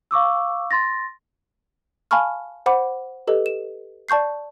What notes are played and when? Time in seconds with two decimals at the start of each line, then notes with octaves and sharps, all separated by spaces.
0.11 F5 C#6 D6 E6
0.71 C6 A6 A#6
2.11 F5 G#5 A5 B5 C#6 F6
2.66 C5 F#5 B5 D6
3.27 G4 A4 B4 D#5
3.46 E7
4.09 D5 A5 C#6 G6 C7